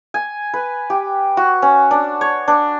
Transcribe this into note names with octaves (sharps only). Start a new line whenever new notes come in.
G#5
B4
G4
F#4
C#4
D4
C#5
D4